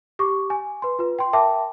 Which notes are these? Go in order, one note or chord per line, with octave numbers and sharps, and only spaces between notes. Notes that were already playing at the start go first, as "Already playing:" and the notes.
G4 C#6 D6
G#5
B4 C6
F4 B4
G5 C6
A#4 E5 G5 A5 D6